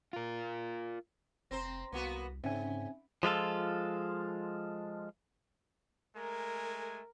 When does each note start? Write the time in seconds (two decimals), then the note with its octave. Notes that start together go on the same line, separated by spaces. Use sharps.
0.13 F4 A#4
1.51 F1 C4 C5 A#5 C6 A#6
1.92 C2 A#3 B3 F#4
2.44 G#2 C#3 C4 C#4 D#4 E5 G#5
3.23 F3 G#3 F4 A4
6.16 G#3 A3 A#4 G#5